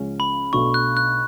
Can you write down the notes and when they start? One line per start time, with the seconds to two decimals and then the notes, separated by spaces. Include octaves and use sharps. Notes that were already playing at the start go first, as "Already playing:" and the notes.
Already playing: C#2 C#3 F3 G#3 C#4
0.20 B5
0.53 B1 B2 A3 D4 F#4 C#6
0.74 F#6
0.97 F#6